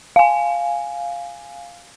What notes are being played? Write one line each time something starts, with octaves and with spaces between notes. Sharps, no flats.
F5 G#5